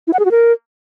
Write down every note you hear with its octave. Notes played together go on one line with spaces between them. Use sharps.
E4
F#5
G#4
F#4
A#4